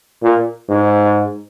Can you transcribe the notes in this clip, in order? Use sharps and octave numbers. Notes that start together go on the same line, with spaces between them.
A#2
G#2